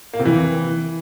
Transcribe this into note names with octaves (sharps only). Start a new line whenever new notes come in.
A#3
C3
E3